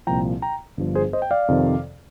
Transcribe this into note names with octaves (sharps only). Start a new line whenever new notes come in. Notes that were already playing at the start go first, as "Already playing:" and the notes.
C2 A#2 F3 G5 A#5
G5 A#5
G1 G2 F3
G#4 C5
C5 D#5
G5
D5 F5
F2 C3 D#3